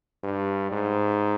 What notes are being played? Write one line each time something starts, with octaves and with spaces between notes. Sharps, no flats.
G2
G#2